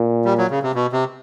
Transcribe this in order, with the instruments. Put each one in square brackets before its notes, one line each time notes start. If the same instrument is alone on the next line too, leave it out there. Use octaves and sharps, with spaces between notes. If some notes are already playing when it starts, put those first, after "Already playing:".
Already playing: [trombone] A#2
[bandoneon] G3
F#3
C#3
C3
B2
C3